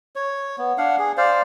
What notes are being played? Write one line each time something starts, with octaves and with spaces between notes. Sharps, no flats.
C#5
B3
D4 F5 F#5
G#4
C5 D5 F5